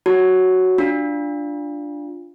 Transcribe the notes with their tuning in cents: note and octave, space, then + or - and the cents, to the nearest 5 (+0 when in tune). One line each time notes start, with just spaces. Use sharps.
F#4 +5 C#5 +0 A5 +25
D4 +0 F4 +0